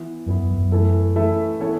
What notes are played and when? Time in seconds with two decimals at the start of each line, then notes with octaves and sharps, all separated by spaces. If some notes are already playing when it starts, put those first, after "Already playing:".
Already playing: E3 B3 E4
0.26 F#2 E3 B3 E4
0.42 F#2
0.57 F#2
0.71 E3 A3 E4 A4 E5
1.16 E3 A3 E4 A4 E5
1.60 E3 B3 E4 A4 C#5